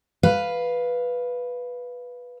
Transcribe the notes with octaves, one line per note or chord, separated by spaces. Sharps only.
B4 F5